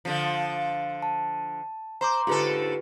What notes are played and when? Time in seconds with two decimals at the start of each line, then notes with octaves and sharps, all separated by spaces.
0.05 D3 F3
1.02 A5
2.01 C5 A#5 C6 D6
2.27 G#2 D3 F4 G4 A4 B4